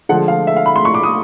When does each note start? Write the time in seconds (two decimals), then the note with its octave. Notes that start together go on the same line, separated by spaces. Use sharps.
0.09 D3 F3 G#3 F#5
0.28 F5
0.47 E5
0.56 F5
0.66 B5
0.76 C6
0.85 C#6
0.94 D6
1.03 D#6